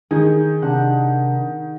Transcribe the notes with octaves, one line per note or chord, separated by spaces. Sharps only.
D#3 G#4
C3 D4 F#5